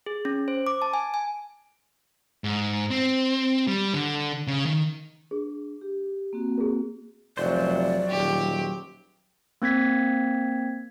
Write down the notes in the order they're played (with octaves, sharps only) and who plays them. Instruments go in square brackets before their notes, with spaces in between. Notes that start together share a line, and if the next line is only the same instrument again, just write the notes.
[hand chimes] G#4
C#4
C5
D6
A5
G#5
G#5
[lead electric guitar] G#2
C4
G3
D3
C#3
D#3
[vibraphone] D4 [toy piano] G#4
[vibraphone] G4
A#3 C4 F#4
[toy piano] G#4 A#4
[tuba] F1 [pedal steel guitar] F#3 C5 [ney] D5
[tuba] D#1 [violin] G4
[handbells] A#3 C4 G#6 B6